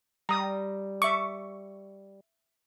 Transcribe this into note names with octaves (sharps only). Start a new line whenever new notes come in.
G3 A#5 D#6
E5 C#6 D6